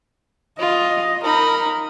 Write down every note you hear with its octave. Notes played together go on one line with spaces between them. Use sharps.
F4 D#5
D#4 A#4 B5